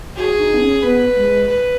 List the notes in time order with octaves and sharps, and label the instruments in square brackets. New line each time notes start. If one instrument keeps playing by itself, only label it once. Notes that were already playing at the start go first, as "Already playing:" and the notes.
[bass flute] F#4 [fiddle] G#4
[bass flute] D#4
B3
C#4
[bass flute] B3 [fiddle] B4
[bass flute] G#3
[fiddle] B4